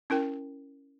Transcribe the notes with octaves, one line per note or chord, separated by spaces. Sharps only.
C#4 E4 A#4 G5